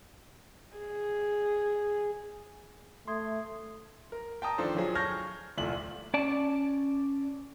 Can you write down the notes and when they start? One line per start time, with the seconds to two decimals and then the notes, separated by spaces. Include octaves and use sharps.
0.77 G#4
3.08 A3 E5 C6 D#6 G#6
4.12 A#4
4.42 G5 A5 A#5 D#6
4.58 D#3 F3 D4 F4 A4 C5
4.75 F3 F#3 G#4
4.95 A5 C#6 F6 G6 G#6 A#6
5.57 D#1 C2 F3 A3 F#7
6.14 C#4 D5 A5